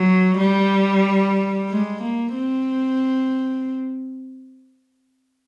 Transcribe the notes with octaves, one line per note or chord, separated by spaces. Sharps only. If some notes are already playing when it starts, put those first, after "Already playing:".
Already playing: F#3
G3
G#3
A#3
C4